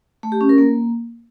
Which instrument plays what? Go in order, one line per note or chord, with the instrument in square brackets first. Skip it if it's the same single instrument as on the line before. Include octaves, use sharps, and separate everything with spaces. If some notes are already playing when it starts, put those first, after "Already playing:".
[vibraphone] A3
G4
C#4
A#4
A#3